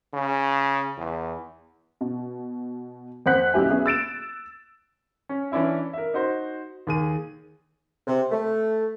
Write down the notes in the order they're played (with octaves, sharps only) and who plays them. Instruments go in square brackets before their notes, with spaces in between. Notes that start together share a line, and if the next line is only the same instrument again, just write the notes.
[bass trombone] C#3
E2
[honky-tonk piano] B2
F2 C5 F#5 F#6 B6
B1 C#3 E4 G4 E5 G#5
B3 C#4 G#4 E5
E6 A6 D7 E7
[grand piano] C#4
E3 C#4 D4 E4 E5
A#4 E5
D#4 F#4 C5
D#2 G#4 D#7
[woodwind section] C3
A3